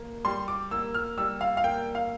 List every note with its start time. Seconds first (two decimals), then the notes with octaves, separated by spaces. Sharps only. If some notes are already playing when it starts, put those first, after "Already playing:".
Already playing: A#3
0.25 G3 C6
0.48 D6
0.71 A#3 E6
0.94 F6
1.18 G3 E6
1.41 F5
1.57 F5
1.64 A#3 G5
1.95 F5